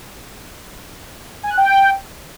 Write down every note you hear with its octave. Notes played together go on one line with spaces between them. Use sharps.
G#5
F#6
G5